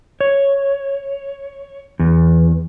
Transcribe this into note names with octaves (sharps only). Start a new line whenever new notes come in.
C#5
E2